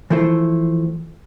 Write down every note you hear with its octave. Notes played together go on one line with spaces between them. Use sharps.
E3 F3 A3 E4 C5